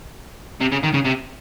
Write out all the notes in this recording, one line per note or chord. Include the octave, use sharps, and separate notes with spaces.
C3
C#3
D#3
C#3
C3